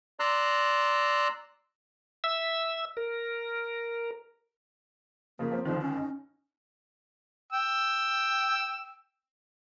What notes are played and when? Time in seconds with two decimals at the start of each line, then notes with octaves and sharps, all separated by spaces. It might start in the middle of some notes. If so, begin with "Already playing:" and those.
0.20 D5 A#5 C6 E6 F#6
2.24 E5 E6
2.97 A#4
5.39 C#3 F3 A#3
5.51 F3 C4
5.65 C#2 D3 D#3 F3
5.81 C#4
5.96 D#4
7.53 G5 E6